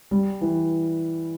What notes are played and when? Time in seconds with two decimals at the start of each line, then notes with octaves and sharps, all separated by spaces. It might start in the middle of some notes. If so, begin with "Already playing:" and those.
0.11 G3
0.41 E3